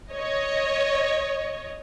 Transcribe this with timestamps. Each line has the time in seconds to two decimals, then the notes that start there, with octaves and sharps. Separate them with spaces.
0.11 C#5 D#5